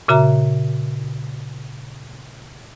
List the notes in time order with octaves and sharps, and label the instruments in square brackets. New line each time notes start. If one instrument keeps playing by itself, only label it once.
[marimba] A#2 C#3 F#4 E5 A#5